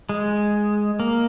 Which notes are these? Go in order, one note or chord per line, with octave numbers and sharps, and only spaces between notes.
G#3
A#3